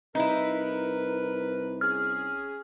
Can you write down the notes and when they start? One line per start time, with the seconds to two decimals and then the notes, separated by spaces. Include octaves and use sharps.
0.15 C2 D#4 E4 A#4 B4
1.81 C#4 G#4 F6